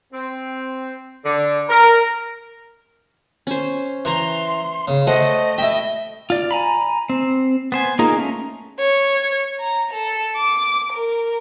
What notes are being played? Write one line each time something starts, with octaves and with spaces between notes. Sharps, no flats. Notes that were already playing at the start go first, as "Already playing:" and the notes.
C4
D3
A#4
C#4 C5
E3 A#5 C6
C#3
A3 C5 D#5 F#5
E4 E5 G5
F4 D5
G#5 A#5 B5
C4
B3 C5 G#5
A#3 D#4 F4 G#4 A#4
A3 C#4
C#5
A#5
A4
D6
A#4